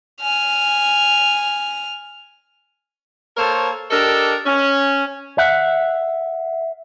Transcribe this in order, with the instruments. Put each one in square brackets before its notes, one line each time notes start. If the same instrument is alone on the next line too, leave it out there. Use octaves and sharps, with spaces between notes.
[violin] G#5 F6
[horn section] A#3 A4 A#4 C5 C#5
D4 G4 A4 A#4 D#5
C#4
[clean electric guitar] E5 F#5